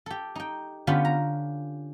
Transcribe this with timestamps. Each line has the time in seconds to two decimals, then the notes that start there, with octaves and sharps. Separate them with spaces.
0.06 G4 A4
0.35 D#4 G5
0.87 D3 B3 C#4 F4 G4
1.05 A#5